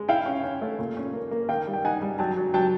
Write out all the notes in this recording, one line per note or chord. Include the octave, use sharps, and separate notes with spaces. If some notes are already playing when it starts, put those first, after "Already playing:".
Already playing: G#3
E4 F5 G5
C#4
C#4
A3
A#2
C#4
A#3
A#3
D#3 F5 G5
G3
G5
D#4 F#5 G#5
G3
F#3 G5 A5
F#3
F#3 G5 A5